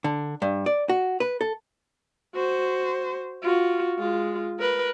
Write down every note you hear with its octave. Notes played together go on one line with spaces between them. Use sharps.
D3
G2
D5
F#4
B4
A4
F#4 C5
F4 F#4
G#3 F4
A#4 B4